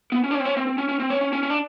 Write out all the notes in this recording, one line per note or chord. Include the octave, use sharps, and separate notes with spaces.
B3
C#4
D4
C#4
C4
C#4
C4
C4
C#4
C#4
C4
C#4
C#4
C#4
C#4
D4